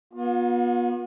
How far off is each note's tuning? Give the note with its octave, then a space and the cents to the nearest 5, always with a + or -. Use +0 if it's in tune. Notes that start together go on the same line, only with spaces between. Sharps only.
B3 -35 F4 +40